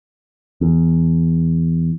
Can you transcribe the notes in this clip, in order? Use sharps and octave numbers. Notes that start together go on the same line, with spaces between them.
E2